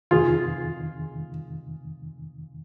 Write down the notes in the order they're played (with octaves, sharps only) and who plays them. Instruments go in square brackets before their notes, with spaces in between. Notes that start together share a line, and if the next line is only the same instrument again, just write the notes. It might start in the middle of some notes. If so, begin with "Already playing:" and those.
[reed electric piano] F2 C3 D#3 [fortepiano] F4 G#4